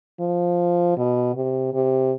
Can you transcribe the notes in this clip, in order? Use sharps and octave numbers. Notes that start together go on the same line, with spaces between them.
F3
B2
C3
C3